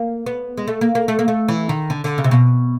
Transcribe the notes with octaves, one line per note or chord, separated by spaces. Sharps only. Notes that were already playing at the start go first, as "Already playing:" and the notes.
Already playing: A#3
B3
G#3
A3
A#3
A#3
A3
A#3
A3
E3
D#3
D3
D3
C#3
C3
B2